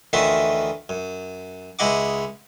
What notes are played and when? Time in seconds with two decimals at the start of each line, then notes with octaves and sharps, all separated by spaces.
0.13 D2 D#3 E3 F4 F#4 E5
0.89 F#2
1.79 C#2 G#3 E4 D#5 F#5 D6